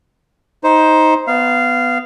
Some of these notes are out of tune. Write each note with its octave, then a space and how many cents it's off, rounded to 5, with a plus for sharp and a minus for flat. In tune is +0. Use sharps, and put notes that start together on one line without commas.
D#4 +15 C5 +0
B3 +15 F5 -15